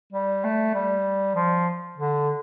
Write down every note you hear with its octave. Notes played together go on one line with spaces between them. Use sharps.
G3
A3
G3
F3
D3